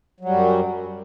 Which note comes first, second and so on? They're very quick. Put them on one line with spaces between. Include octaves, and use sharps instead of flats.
F#3 G3 F#2